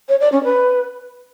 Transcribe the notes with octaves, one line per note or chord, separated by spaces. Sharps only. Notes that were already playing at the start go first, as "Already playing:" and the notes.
C#5
D5
C#4
B4